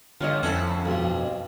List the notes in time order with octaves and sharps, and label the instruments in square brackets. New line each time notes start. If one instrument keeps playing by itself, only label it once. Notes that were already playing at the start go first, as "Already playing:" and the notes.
[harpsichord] G2 [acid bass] D3 [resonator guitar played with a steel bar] F4 C#5 D#5
[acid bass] F2 [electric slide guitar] F3 [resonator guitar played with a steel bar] A3 C#4 [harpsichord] E4 A4 F#5
[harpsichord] B1 G2